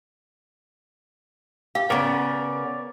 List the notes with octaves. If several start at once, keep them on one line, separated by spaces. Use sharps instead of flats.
G4 F5
C#3 B3 A#4 C#5 D5